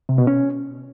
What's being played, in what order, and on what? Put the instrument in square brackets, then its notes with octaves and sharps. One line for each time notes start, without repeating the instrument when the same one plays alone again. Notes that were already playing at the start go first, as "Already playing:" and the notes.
[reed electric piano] C3
B2
C#4